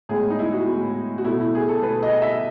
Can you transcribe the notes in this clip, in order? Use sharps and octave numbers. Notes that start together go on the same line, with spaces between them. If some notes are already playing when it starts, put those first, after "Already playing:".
A2 G#3 B3 G#4
D#4
E4
F#4
A2 G#3 B3
F#4
B2 A3 E4
E4
G#4
A4
B2 A3 B4
D#5
E5